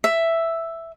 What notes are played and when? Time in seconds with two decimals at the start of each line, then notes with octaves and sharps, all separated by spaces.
0.04 E5